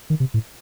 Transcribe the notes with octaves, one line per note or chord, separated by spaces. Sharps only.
D#3
C3
A2